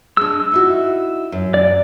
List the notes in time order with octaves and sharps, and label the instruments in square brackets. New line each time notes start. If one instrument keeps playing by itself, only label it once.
[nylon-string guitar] G#3 D4 [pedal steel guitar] E6
[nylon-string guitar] D#4 E4 F#4
F#2
[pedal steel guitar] D5